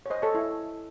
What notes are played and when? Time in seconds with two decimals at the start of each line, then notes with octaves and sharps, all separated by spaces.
0.06 C#5
0.10 C5 D#5
0.22 A4 C#5
0.35 E4